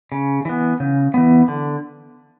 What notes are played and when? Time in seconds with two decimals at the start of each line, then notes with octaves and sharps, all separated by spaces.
0.12 C#3
0.45 E3 B3
0.80 C#3
1.14 E3 B3
1.48 D3